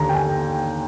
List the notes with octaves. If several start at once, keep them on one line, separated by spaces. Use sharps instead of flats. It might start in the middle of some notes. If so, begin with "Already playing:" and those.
Already playing: D#2 D3 A#5
G5
G#5